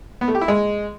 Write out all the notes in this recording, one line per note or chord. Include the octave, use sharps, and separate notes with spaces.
B3
A3
G4
E4
G#3